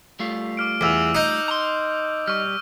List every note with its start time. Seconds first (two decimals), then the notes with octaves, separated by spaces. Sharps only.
0.19 G3 A3 F4
0.57 D6 F6 D7
0.81 E2 D6 E6 F7
1.15 D#4 D#6 F#6 G6
1.48 A#5 C6
2.27 G3 C#6 F6